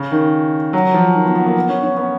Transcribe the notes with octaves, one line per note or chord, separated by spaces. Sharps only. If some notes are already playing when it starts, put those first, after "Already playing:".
Already playing: C#3
D#3
F#3
F3
D#3
B3
B3
A#3
B3
C#4
C#4
B3